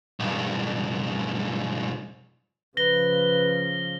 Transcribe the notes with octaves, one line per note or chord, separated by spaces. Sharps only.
B1 G2
C#3 F3 B4 A#6 G7